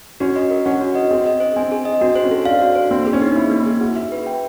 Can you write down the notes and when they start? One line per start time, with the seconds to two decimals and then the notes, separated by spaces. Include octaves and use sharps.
0.20 C#4 F#4
0.36 D#5
0.50 A#4
0.65 C#4 F#5
0.81 F#4
0.95 D#5
1.11 C4 G#4
1.26 D#5
1.40 C5
1.56 C4 G#5
1.72 G#4
1.85 D#5
2.01 C4 F#4
2.16 C5
2.24 C#4
2.31 A4
2.45 D4 F5
2.62 F#4
2.76 C5
2.91 A#3 C4
3.07 G#4
3.13 C#4
3.22 D#4
3.36 A#3 E4
3.51 A#3
3.58 E4
3.66 G#4
3.81 F#4 G#4
3.96 E5
4.12 B4
4.27 G5